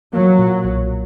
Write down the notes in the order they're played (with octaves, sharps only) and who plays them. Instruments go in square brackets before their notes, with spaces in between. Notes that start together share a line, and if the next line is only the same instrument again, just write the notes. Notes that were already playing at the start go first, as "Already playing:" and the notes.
[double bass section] F#3 [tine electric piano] A#3
[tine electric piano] A#2
B1